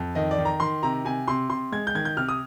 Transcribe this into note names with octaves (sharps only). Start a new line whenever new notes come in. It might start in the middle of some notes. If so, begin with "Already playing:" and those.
Already playing: F2
D#3 D#5
D5
D#3
A#5
D#3 C6
C3 A#5
C3 G#5
C3 C6
C3 C6
G#3 G#6
G6
D#3 G#6
G6
C3 F6
D#6